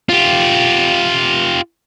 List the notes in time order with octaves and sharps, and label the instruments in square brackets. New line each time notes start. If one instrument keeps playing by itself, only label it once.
[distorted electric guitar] F4 G4